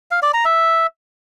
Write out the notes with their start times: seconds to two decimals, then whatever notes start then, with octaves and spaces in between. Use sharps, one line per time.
0.11 F5
0.22 D5
0.34 A#5
0.45 E5